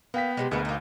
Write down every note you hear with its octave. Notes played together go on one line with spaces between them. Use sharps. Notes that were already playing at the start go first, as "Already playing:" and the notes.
A#3 B3 G5 B6
C3 F3 G#3
D2 G#3 A#3 B3
A#3 D#4